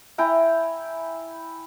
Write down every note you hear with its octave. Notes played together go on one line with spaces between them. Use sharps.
E4 G5 G#5 A#5